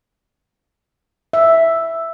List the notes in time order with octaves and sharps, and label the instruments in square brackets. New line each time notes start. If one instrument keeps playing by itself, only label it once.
[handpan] E5